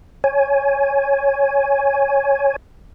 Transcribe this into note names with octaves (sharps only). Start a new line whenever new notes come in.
C#5 G#5